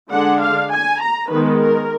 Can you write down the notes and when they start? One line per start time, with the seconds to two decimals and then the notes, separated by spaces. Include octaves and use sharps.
0.11 D3 G#3 D4 F#5
0.41 F5
0.71 G#5
1.02 A#5
1.31 D#3 G#3 B3 B4
1.61 A#4